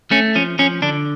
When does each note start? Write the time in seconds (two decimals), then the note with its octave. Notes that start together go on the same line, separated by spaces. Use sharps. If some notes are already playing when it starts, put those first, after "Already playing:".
0.11 A3 C#4
0.35 F3 C#4
0.59 F3 C#4
0.82 D3 D4